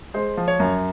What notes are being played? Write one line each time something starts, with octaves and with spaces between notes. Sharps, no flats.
G#3 C5
F3
C#5
F#2